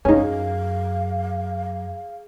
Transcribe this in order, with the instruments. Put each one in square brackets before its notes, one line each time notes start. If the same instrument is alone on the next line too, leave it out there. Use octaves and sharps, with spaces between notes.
[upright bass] F#2 [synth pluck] C#4 D#4 [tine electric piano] G#4 [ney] F5